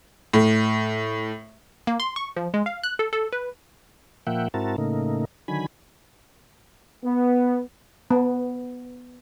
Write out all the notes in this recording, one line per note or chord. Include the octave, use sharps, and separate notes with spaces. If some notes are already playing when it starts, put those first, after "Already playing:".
A2
A#3
C6
C#6
F3
G#3
F5
F#6
A4
A4
B4
A#2 F3 A#3 E5 F#5 G5
G#2 C4 E4 F#4 A#4 A5
A2 C#3 A3 A#3 D#4
D3 D#3 F#3 G#5 B5
B3
B3